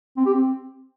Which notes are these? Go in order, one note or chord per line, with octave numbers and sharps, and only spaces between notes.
C4
G4
C4